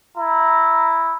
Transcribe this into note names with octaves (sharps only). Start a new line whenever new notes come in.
E4 A#5